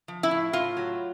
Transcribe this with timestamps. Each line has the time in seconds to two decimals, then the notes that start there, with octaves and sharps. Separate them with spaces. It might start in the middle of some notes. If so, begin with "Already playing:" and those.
0.08 F3
0.23 E4
0.31 A2
0.53 A2 F4
0.77 F#3